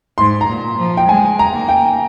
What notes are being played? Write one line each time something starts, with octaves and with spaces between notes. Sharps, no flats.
G#2 C6
A#5
A#2
F3
G5
G#3 G#5
A#5
A#3
G5